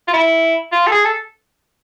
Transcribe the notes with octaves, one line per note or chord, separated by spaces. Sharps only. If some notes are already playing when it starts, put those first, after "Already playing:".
F4
E4
F4
A4
G#4
A4